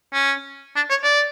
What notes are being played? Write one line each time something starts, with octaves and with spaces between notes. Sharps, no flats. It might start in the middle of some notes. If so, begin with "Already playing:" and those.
C#4
D4
C#5
D5